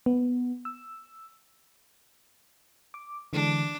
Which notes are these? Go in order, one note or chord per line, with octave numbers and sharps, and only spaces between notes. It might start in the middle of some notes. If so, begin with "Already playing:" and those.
B3
E6
D6
D3 E3 G#3 D4